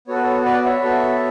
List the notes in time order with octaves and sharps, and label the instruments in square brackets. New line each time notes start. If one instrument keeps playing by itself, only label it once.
[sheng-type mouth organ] B3 F#4 A4 C#5
B4
A4 C#5
B4 D5
C#5 E5
B3 F#4 A4